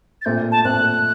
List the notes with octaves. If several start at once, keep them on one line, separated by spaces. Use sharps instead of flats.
A6
A#2 A3 C4 G6
A5
A#2 A3 C4 F#6